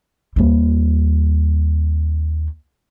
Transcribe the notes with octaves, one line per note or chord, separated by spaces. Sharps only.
D#2 G3